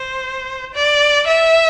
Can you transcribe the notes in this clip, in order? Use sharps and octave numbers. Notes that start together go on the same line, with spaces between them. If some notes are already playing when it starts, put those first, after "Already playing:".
Already playing: C5
D5
E5